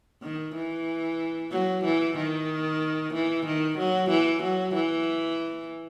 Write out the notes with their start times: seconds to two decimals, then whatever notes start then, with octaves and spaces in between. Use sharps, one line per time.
0.22 D#3
0.55 E3
1.52 F#3
1.84 E3
2.17 D#3
3.14 E3
3.46 D#3
3.78 F#3
4.10 E3
4.43 F#3
4.75 E3